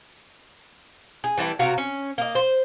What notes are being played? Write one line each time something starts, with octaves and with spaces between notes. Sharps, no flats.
G#4
E3 G3 A3 B4
C3 F#4 A#4 F5
C#4
A#3 D#5
C5